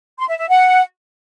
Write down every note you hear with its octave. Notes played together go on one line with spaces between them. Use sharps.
C6
E5
E5
F#5